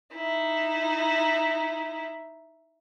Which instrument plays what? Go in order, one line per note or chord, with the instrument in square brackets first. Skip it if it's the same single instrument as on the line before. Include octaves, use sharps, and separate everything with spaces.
[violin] D#4 E4